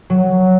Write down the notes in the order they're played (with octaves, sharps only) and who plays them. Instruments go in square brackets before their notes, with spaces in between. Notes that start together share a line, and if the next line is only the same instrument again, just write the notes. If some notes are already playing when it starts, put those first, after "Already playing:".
[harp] F#3